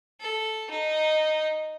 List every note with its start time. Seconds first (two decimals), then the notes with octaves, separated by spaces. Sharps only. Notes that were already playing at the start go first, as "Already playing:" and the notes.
0.21 A4
0.70 D#4